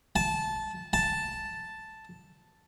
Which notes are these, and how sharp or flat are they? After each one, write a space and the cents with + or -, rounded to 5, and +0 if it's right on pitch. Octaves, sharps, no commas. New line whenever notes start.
A5 -15
A5 +0